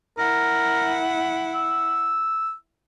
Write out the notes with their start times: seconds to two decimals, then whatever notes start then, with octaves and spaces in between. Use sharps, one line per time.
0.18 E4 A#4 F#5
1.55 E6